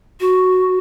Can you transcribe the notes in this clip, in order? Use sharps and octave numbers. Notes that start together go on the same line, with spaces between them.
F#4